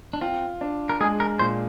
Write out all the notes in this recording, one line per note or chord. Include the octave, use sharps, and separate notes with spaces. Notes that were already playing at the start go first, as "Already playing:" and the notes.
D4
C4 F4
D4
A#4
G#3 G#4
A#4
A#2 C5